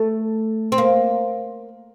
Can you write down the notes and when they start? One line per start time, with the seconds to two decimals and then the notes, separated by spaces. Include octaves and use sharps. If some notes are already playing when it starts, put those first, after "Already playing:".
Already playing: A3
0.72 C4
0.78 A#3